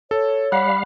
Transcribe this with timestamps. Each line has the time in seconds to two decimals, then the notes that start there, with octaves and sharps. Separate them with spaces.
0.11 A4 C#5
0.52 G3 F5 F#5 B5 F#6